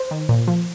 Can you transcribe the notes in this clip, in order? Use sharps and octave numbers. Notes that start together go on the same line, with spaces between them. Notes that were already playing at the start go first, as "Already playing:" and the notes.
Already playing: C5
D#3
A#2
F3